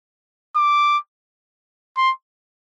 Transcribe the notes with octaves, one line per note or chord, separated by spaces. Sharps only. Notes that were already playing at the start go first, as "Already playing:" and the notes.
D6
C6